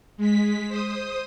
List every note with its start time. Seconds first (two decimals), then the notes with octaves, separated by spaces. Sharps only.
0.17 G#3 B6
0.68 C5 D#6